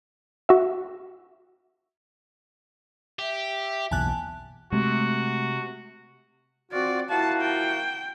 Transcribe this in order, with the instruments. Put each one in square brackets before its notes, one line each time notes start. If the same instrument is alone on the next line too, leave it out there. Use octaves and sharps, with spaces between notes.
[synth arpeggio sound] F#4 E5
[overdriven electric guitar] G4 [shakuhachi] E5
[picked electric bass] F#1 B1 E2 [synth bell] G#5 A5 F#6
[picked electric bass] C3 [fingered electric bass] G#3 A3 [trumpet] F#4
[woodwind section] C4 F4 F#4 [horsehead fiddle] D5
[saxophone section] F3 A#3 F#4 [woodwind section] E4 F5 [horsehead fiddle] A5
[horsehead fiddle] G5